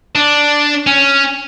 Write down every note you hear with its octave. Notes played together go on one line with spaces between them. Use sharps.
D4
C#4